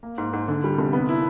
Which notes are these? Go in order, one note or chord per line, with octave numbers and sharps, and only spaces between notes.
A#3
G#2
G#2
D3
G3
F1
B3
E4